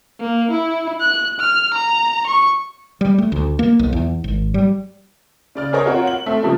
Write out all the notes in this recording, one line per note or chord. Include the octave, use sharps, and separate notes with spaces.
A#3
E4
F#6
F6
A#5
C#6
G3
A3
D2
A#3
B1
E2
G#1
G3
C#3 D5 F6
G#4 A#4 C5 C#5 D#5 A#5
C4 F4 F#4 A#4 C#5
F#7
A3 C4 E5
C#3 F3 G3 A#3